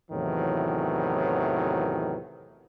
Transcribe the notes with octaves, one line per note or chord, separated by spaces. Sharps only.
E2 A2 C3 D#3 E3 F#3